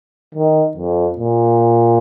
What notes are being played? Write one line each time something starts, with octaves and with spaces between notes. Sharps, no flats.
D#3
F2
A#2